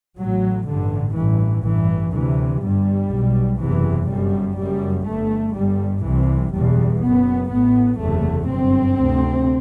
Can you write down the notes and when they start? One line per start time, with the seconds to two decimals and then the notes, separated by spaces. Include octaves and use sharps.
0.19 A1 A2 F#3
0.68 A1 G2 D3
1.16 A1 G2 E3
1.65 A1 G2 E3
2.14 D2 C3 E3
2.63 G1 G2 G3
3.11 B1 B2
3.61 F#1 E2 C3 E3
4.09 G1 F#2 G3
4.58 F#1 F#2 G3
5.06 G1 G2 A3
5.55 G1 G2 G3
6.04 C2 C3 E3
6.53 F#1 E2 B2 G3
7.02 F#1 F#2 B3
7.50 A1 A2 B3
7.99 F#1 E2 C3 A3
8.48 G1 F#2 C4
8.97 D2 C3